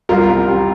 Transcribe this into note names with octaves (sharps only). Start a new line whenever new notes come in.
C2 F4 A#4
C3
C3